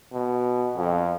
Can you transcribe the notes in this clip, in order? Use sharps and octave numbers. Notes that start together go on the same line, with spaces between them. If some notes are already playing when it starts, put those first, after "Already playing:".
B2
F2